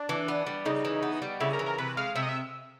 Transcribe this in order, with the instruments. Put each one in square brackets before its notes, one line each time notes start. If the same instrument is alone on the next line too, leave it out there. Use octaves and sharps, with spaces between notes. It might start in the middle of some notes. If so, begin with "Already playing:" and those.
Already playing: [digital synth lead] D4
[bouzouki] E3
B3
G3
[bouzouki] C#3 [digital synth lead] D#4
[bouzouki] E3
B3
G3
[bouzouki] C#3 [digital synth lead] E4
[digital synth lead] A#4
[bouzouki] E3
[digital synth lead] A#4
[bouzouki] C3 [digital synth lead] B4
[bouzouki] G#3 [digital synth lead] F5
[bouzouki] C3 [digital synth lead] E5
[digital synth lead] D#5
E5